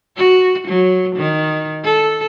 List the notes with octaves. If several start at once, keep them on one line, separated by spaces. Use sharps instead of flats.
F#4
F#3
D#3
A4